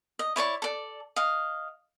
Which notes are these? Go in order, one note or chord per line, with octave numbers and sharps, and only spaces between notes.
D#5
E4 C#5 D5 C#6
A4 D5
D#5 F5